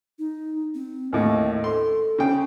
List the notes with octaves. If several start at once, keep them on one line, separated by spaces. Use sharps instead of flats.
D#4
C4
D#2 A2 D#5
A4 C6
C#3 G5